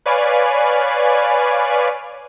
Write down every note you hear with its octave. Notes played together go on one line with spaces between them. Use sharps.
B4 C#5 D5 F5 G#5 B5